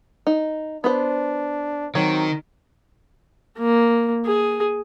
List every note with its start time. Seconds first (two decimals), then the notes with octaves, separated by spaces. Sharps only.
0.27 D#4
0.84 B3 D4 B4 C5
1.95 D#3 F#3 C4
3.58 A#3
4.26 G#4